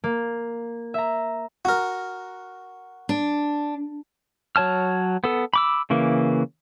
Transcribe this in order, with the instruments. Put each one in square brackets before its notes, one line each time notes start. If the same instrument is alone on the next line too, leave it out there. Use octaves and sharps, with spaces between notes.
[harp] A#3
E5 A#5
[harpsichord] F#4 A#4
[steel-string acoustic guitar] D4
[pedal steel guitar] F#3 C#5 A5 F6
B3 A4
B5 D6 E6
C#3 E3 A#3